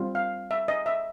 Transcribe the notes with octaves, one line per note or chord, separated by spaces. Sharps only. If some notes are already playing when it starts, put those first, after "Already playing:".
Already playing: G3 C4 F4
F5
E5
D#5
E5